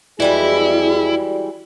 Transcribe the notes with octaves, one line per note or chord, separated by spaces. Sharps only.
F2 E3 G3 G#3 E4 F#4 G#4 D5